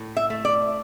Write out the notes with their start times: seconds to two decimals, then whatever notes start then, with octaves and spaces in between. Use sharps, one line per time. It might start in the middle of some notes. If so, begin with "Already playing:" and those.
Already playing: A2
0.16 E5
0.30 A3
0.45 D5